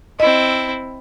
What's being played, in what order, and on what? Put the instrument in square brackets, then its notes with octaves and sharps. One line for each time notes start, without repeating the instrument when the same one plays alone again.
[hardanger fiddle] C4 E4 [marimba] D#5